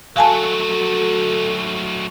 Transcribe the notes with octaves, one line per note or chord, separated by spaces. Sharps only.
F#3 A3 F#4 A4 F5 G#5 A5